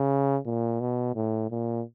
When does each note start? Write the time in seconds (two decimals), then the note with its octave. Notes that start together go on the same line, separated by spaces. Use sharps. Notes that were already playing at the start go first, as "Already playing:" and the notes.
Already playing: C#3
0.46 A#2
0.81 B2
1.15 A2
1.51 A#2